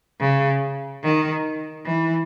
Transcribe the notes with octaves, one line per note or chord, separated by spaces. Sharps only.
C#3
D#3
E3